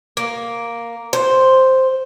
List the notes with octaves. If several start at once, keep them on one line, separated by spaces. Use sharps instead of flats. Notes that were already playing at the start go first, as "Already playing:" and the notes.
A#3
C5